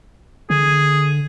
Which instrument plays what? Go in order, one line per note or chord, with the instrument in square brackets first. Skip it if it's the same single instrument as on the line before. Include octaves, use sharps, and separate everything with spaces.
[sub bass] D3 [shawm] G#4